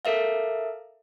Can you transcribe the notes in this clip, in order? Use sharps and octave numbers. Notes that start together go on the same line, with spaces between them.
A4 A#4 E5 F5